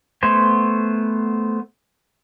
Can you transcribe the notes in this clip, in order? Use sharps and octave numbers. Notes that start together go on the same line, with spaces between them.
A3 B3 C5 G#5